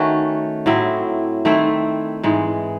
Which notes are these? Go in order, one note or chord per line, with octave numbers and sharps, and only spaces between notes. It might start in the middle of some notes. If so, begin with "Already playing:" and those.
Already playing: D#3 A3 C#4 F#4
A2 F#3 C4 E4
D#3 A3 C4 E4
G#2 E3 G#3